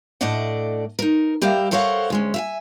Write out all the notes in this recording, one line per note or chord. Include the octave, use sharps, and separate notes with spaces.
A2 A3 D4 D5 D#5 F#5
D#4 A#4
G3 G4 A#4 E5 F5
A4 A#4 C5 C#5 F5 F#5
D2 G#3 C#4
E5 F5 G#5